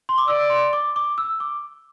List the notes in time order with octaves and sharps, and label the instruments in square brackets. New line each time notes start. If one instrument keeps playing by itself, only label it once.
[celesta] C6
D6
[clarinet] D5 [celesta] E6
[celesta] C6
D6
D6
E6
D6